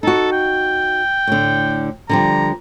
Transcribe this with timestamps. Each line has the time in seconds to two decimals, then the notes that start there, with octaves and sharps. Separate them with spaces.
0.03 D#4 F#4 A4
0.32 G5
1.27 A2 D3
2.09 D3 F3 G3 A#5